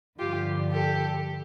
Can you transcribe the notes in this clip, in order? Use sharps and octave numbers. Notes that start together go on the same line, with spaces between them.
G2 D3 F3 F4 G4
G4 A4